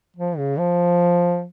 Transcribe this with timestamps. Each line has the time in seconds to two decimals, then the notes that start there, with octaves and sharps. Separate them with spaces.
0.16 F3
0.38 C#3
0.59 F3